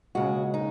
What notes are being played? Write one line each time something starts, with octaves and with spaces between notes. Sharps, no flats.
D#2 C#3 G#3 F#4
D#4